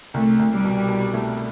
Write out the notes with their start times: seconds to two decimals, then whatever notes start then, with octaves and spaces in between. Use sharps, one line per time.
0.14 C2 A3
0.39 C2
0.52 G3
0.64 B2
0.89 B2
1.14 A3